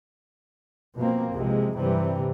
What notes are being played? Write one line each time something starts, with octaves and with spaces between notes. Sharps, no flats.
B2 F3 A#3 C4
B1 E2 C3 F3 G#3
G2 C3 E3 G3